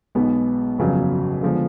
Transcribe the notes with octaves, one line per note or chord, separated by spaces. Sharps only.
B1 B2 G#3 B3
G1 F2 C#3 F#3
D3 F3 G#3 B3